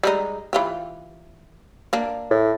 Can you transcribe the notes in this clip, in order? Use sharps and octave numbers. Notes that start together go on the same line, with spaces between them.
G3 G#3 D#4
E3 F4 G4
A#3 D4
A2